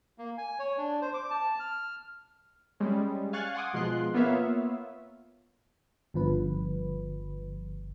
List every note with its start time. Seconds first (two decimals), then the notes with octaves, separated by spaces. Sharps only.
0.18 A#3
0.38 G#5
0.59 C#5
0.78 D4
1.01 C5
1.14 D6
1.31 A5
1.60 F6
2.80 G3 G#3 C#4
3.33 F5 G#5 C#6 F6 F#6 A6
3.54 F#5 G#5 C6 D6 D#6
3.74 B2 F3 G#3 F4 C6 F#6
4.14 A#3 B3 F4 C#5 E5 F5
6.14 G1 G2 F3 B4